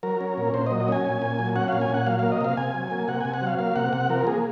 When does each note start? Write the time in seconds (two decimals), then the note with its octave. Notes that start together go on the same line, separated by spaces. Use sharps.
0.03 F#3 A#4
0.21 C#4
0.37 A#2
0.54 A#2 C5
0.66 F#3 D#5
0.80 D#5
0.88 C#4 G#5
1.05 A#2
1.22 A#2
1.39 F#3
1.56 C#4 F#5
1.68 A#2 F5
1.81 G#5
1.89 A#2 F#5
2.06 F#3 F5
2.19 A#3 F5
2.32 D#5
2.41 C3 F5
2.57 C3 G#5
2.74 F#3
2.91 A#3
3.08 C3 F#5
3.21 C3 G#5
3.34 F#5
3.42 F#3 F5
3.59 A#3 F5
3.76 C3 F#5
3.93 C3 F#5
4.09 F3 A#4
4.27 A#3 G#4